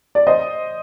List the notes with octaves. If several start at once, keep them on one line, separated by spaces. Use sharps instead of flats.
D5
C5 D#5